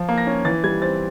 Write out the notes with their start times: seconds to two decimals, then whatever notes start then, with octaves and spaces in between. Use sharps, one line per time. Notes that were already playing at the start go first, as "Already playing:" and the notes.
Already playing: F3
0.09 A#3
0.18 A#6
0.27 C#4
0.45 E3 A6
0.64 G3 G#6
0.82 C4 A6